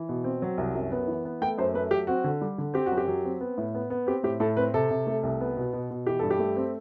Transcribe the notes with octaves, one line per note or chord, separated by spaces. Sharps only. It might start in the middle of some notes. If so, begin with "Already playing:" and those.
Already playing: E3
B2
C4
F#3
C2
F#2
B3
E3
B3
A3 G5
F#2 C5
A3 B4
F#3 G4
C4 F#4
D3
G3
D3
C4 G4
F#4
F#2
G4
F#3
C4
B3
A2
B3
B3
C4 G4
A2 G4
A2 A4
C4 B4
C3 A4
C3
A3
C2
B3
B2
B2
B2
E3 G4
G2 A4
G4
A3
C4